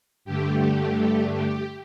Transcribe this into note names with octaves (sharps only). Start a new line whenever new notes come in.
G2 D3 A3 G4
G4